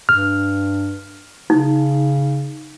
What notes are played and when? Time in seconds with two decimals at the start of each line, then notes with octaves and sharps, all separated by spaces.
0.09 G2 F6
1.50 C#3 D#4